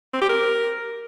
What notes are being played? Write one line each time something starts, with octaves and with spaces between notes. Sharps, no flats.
C4
G4
A#4